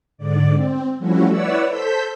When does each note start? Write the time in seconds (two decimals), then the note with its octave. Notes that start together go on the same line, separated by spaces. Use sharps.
0.18 G#2 D3 D5
0.54 C4
0.99 F3 G3 A3 C#4 E4 F#4
1.29 E4 B4 C#5 D5 F#5 E6
1.70 A4 C5 E6 G6 B6